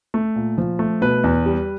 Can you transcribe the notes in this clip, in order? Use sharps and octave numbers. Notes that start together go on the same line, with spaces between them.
A3
A#2
F3
A3
B2 B4
E2
G3